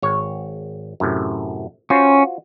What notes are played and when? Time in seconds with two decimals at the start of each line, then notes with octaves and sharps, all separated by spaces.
0.02 G#1 C#5
1.00 F#2 A2 C3
1.90 C#4 F4 F#4 C5